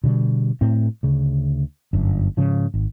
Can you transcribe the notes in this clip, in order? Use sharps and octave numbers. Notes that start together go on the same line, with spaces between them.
B2 D3 E3 G3
A2 A3 C4
D2 C#3
G1 F#2
G#2 C#3 F3
G#1